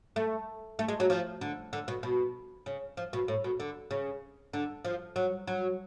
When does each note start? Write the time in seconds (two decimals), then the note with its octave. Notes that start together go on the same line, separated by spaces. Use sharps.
0.16 A3
0.79 A3
0.88 G#3
1.00 F#3
1.10 F3
1.41 D3
1.73 D3
1.88 B2
2.03 B2
2.66 C#3
2.97 F3
3.13 B2
3.28 A2
3.44 B2
3.60 D3
3.91 C#3
4.53 D3
4.85 F3
5.16 F#3
5.47 F#3